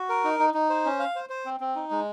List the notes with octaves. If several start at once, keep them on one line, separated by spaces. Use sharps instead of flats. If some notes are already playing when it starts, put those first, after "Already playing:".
Already playing: F#4
A#4
D#4
D#4
D#4
C5
C#4
F5
C5
C5
C4
C4
D#4
G#3